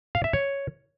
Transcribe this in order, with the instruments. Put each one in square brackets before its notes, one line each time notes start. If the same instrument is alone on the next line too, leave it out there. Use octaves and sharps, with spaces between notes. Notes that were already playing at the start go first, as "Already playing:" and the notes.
[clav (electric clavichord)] F5
E5
C#5